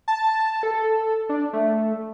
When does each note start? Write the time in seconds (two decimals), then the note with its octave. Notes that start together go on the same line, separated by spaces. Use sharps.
0.08 A5
0.63 A4
1.29 D4
1.53 A3